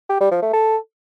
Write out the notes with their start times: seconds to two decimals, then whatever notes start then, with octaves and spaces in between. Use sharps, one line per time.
0.09 G4
0.20 G3
0.31 F3
0.42 A3
0.53 A4